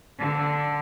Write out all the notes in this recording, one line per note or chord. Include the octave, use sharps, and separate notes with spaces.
D3